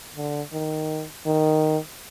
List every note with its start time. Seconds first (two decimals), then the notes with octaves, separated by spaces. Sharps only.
0.16 D3
0.53 D#3
1.26 D#3